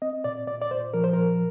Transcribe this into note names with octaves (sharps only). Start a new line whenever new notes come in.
C4 D#5
A#2 D5
A#2 D5
D5
A#2 C5
F3 A#4
C5
A#2 A#4